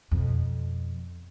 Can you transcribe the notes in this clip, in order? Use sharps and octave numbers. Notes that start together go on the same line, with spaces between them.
F2 B2